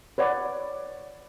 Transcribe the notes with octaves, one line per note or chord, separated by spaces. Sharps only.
B4 C#5 D5 F#5